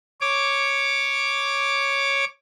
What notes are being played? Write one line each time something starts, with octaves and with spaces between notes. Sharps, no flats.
C#5 D6